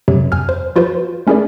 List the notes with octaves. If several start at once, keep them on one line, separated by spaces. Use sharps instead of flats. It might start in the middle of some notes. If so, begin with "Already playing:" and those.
F#2 C3 F#3
F2 G#5 F6
C5
F3 F4 F#4 B4 C5
A3 C#4 E4 G#4 A#4 D5